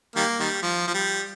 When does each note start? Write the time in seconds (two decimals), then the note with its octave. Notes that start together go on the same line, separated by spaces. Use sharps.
0.16 D#3 G3 A#3
0.40 D#3 G3
0.62 F3
0.87 F3
0.94 G3